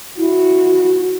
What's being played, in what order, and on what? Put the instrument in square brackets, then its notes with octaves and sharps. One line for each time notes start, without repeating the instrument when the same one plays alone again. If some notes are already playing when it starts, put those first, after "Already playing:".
[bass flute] E4 [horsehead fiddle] F#4